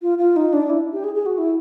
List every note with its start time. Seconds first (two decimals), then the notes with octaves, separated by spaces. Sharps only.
0.02 F4
0.18 F4
0.36 D#4
0.53 D4
0.69 E4
0.93 G4
1.04 G#4
1.15 G#4
1.26 F#4
1.38 E4